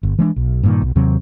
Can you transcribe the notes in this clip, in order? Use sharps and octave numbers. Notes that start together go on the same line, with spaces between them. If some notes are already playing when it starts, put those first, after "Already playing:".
G1
E3 G#3 B3 D4
B1
G2 A#2 D#3
B1
D#2 C3 F#3 C4